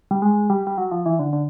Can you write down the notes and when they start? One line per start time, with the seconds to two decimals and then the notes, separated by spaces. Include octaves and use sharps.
0.11 G3
0.22 G#3
0.50 G3
0.67 G3
0.78 F#3
0.91 F3
1.06 E3
1.19 D3
1.33 D3